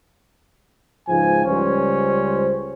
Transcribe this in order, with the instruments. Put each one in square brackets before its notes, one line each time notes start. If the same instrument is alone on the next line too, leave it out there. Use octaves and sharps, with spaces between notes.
[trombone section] C#2 G#2 F3 [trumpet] G#5
[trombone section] C#2 G3 C5 [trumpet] C#4